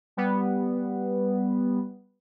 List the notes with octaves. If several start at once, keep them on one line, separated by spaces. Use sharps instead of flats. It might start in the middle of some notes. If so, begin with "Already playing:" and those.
G3 B3